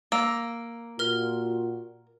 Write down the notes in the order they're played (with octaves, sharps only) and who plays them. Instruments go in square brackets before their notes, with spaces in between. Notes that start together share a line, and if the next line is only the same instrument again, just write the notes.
[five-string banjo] A#3 [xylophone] E6
[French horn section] A#2 F4 F#4 [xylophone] A#4 F6